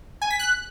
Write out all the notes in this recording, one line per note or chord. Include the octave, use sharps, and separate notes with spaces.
G#5
B6
F#6